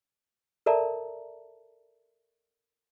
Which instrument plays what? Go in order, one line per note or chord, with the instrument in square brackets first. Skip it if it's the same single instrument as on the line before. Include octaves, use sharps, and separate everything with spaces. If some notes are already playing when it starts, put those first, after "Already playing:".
[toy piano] A4 A#4 D5 E5 A5 A#5